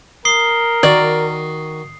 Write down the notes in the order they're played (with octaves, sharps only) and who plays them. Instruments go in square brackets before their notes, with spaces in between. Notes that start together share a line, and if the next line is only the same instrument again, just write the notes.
[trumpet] A#4 [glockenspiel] D#6 C7 G7
[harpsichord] D#3 F#4 [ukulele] D5